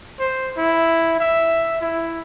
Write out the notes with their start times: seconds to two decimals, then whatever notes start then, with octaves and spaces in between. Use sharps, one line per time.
0.19 C5
0.58 E4
1.20 E5
1.81 E4